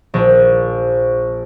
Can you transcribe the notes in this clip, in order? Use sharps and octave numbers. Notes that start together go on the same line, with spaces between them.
A#1